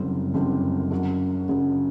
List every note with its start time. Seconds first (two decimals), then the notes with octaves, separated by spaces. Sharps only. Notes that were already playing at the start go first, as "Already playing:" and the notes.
Already playing: F#1 F#2 D3 G3 C4
0.34 F#1 F#2 D3 G3 C4
0.91 F#2 C#3 F#3
1.48 F#2 C#3 F#3